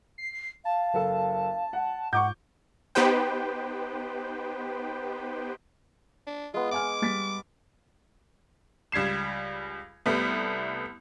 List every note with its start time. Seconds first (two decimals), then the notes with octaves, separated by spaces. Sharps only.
0.18 C7
0.65 F5 A5
0.94 F#1 A4
1.73 F#5
2.13 G#2 F#5 C#6 D6 G6
2.95 B3 D#4 G4 B4 C5 G5
6.27 D4
6.54 G#3 B3 F4
6.71 D#5 G#5 D6 F6
7.02 G3 A6 B6
8.92 C#2 G3 G#6 C7 E7
10.06 C2 G3 A3 B3